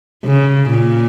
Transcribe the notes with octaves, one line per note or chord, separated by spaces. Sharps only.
C#3
A#2